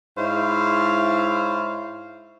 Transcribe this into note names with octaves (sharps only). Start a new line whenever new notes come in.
G#2 E4 C5 C#5 F5